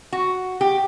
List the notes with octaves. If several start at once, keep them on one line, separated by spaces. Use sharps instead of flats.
F#4
G4